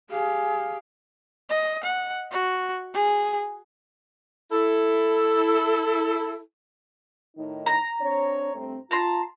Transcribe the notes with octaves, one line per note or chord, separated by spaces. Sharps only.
G4 G#4 F5
D#5
F#5
F#4
G#4
E4 A4
A2 D#3 D#4
A#5
C4 D4 C#5
G2 A3 C4
F4 A5 A#5 C6